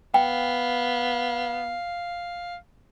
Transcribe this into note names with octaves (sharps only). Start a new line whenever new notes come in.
B3 F5 G5